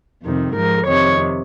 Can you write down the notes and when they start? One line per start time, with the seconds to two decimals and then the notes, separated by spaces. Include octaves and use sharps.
0.23 F2 C3 D#3
0.55 G#2 F3 A#4
0.87 F2 C3 D#3 C#5